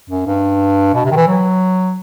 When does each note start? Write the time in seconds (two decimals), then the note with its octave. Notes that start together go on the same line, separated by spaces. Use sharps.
0.10 F#2
0.27 G2
0.94 B2
1.05 C3
1.11 D#3
1.16 E3
1.28 F#3